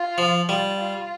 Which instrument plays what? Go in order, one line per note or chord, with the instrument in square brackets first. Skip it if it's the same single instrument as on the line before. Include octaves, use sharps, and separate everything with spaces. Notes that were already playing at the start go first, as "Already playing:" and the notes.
Already playing: [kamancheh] F4
[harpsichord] F3
[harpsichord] G3 [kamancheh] F4
[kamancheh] F4